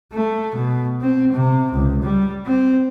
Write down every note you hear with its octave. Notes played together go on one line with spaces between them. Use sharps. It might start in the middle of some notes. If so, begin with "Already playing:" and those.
A3
B2
C4
C3
C#2
G3
C4